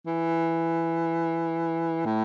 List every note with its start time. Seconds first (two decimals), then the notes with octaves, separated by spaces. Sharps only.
0.06 E3
2.05 A2